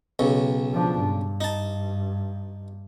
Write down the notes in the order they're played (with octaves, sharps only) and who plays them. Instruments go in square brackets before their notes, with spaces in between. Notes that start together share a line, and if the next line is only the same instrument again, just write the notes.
[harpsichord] B1 C#3
[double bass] F3 D4
G2
[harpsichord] D#4 A5